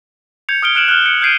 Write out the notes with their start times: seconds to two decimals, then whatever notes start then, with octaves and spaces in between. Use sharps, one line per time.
0.49 G6 G#6 C#7 F7
0.63 D#6 F6 D7 G7
0.75 F6 F#6 D7 E7 F#7
0.88 F6 F#6
1.06 F6 C#7 D7
1.21 F6 G6 G#6 C7 D7 D#7